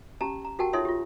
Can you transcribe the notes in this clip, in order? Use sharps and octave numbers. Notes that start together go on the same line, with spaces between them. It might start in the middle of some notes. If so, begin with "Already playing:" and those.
C#4 G4 A5 A#5
A#5
F#4 G4 A#4 F#5 G5 A5
D#4 F4 A4 C#5 E5 C6
F4 G4